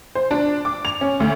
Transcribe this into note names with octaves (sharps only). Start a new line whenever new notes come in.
C5
D4
D6
F7
C#4
D2